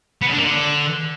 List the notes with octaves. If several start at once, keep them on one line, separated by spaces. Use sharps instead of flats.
B3
C#3
D4
A#3
D3